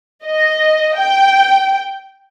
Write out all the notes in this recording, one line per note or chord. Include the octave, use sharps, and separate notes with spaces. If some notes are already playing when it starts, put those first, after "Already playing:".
D#5
G5